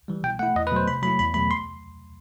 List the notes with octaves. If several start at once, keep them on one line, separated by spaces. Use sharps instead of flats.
E3 G3
B2 G5
A3 E4 F#5
E2 D#5
B4
B2 F#3 A3 C5
C3 B5
F#3 A3 E4 B5
E2 B5
B2 F#3 A3 B5
C6